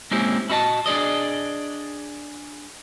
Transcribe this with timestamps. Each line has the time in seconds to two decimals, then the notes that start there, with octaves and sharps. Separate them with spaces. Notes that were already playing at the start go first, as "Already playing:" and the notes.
0.11 G#3 A#3 C4 C#4 E4 G4
0.50 E4 F#4 D#5 A5
0.86 D4 G#4 D5 D#5